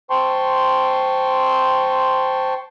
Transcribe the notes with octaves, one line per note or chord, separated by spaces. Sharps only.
C5 G5 A5 C6 C#6